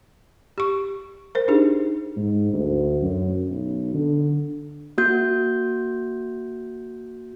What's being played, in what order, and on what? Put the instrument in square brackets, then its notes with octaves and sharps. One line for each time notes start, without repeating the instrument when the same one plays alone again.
[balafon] G4 C#6
A#4 C5
D4 D#4 G4 G#4
[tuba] G#2
D2
F#2
B1
D3
[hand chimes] A#3 F#4 G6